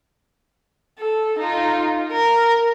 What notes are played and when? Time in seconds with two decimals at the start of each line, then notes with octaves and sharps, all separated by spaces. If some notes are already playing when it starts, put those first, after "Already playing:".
0.99 A4
1.39 D#4 F4
2.12 A#4